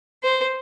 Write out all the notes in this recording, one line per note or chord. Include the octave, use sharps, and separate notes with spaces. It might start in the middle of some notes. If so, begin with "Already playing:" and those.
C5